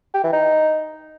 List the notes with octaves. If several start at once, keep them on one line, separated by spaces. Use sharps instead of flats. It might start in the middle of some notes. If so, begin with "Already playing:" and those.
G4
E3
D#4